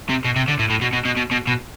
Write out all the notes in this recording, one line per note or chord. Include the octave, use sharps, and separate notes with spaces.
C3
B2
C3
D3
A2
A2
B2
B2
B2
B2
B2
B2